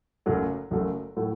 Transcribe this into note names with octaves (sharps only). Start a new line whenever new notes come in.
F#1 F#2 F#3 A3
F#1 F#2 F#3 A3
A2 F#3 A3